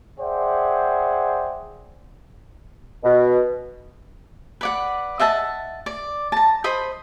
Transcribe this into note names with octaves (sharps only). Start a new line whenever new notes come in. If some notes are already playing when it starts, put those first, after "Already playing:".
G#4 C5 D5 E5 F#5 G5
B2
B4 D5 F#5
D#5 E5 F#5 A5
D5
A5 A#5
C5 D#5 B5